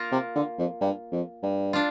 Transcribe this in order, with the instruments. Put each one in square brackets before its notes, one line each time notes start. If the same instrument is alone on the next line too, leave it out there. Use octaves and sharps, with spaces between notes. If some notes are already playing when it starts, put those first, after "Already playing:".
Already playing: [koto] A#3 F4 A#4
[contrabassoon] C3
D3
F2
G2
F2
G2
[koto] D4 F4